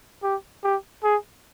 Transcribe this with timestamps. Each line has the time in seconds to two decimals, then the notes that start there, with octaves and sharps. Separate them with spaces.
0.23 G4
0.64 G4
1.04 G#4